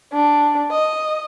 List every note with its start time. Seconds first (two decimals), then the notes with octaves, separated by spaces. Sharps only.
0.13 D4
0.71 D#5